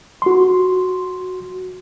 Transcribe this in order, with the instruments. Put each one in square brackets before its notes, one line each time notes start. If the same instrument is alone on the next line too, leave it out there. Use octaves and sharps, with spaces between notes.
[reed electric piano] F#4 C6